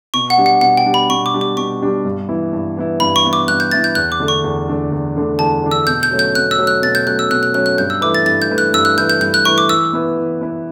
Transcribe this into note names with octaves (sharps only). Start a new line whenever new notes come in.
B2 C#6
F#5
G3 D4 G4
F#5
B2 F#5
G5
G3 D4 G4
B5
B2 C#6
D6
G3 D4 G4
D6
B2 C#6
G3 D4 G4
G2
E3 B3 E4
G2
E3 B3 E4
G2 B5
C#6
E3 B3 E4
D6
G2 F#6
G6
E3 B3 E4 A6
G6
E2 F#6
D6
D3 A3 D4 A4
C#6
E2
D3 A3 D4 A4
E2
D3 A3 D4 A4
E2 A5
D3 A3 D4 A4
E6
B2 G6
G6
F#3 A3 C#4
G6
B2 F#6
E6
F#3 A3 C#4
F#6
B2 A6
G6
F#3 A3 C#4 F#6
E6
B2 F#6
F#6
F#3 A3 C#4 F#6
F#6
G2 G6
E6
E3 A3 E4 B4 D6
A6
G2 A6
G6
E3 A3 E4 B4
F#6
G2 E6
F#6
E3 A3 E4 B4 G6
G6
G2 G6
F#6
E3 A3 E4 B4 C#6
D6
E3 E6
B3 E4 B4
E3
B3 E4 B4